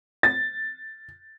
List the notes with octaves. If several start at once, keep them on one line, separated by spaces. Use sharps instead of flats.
A6